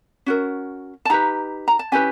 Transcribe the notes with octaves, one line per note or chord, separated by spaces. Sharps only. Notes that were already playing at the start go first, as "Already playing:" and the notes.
C#4 F#4 A#4
A5
D#4 G4 B4 A#5
A#5
A5
C#4 E4 G4 B4 G#5